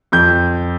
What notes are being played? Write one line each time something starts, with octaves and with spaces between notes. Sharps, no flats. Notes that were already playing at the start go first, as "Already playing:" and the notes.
F2 G6